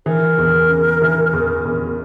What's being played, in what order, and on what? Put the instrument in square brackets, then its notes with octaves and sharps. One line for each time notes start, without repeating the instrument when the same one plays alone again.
[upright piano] E3 [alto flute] A#4
[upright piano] E2
C#3
E3
E2
E2